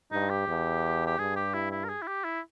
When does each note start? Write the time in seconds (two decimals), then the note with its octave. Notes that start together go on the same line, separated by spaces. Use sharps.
0.12 G2 D#4
0.30 G4
0.47 E2
1.06 G4
1.19 G2 G#4
1.36 G4
1.54 E4
1.71 E4
1.84 A#4
1.89 G#4
2.02 E4
2.07 G4
2.24 E4